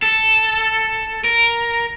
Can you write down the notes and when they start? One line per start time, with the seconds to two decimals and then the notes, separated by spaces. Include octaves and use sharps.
0.02 A4
1.24 A#4